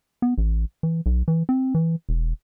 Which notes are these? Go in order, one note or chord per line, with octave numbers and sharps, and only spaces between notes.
B3
A1
E3
B1
E3
C4
E3
E1